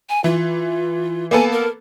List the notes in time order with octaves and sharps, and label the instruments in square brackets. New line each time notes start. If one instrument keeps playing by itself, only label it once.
[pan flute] G#5
[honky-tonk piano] E3 [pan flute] F4
[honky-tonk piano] A#3 B3 A4 [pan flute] G#5
[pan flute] A#4